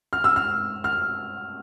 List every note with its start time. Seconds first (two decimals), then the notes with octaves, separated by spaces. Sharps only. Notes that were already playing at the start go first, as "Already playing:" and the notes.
0.13 F6
0.24 E6
0.36 F6
0.84 F6